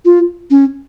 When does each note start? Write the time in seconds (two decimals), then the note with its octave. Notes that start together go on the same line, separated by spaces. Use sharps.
0.05 F4
0.51 C#4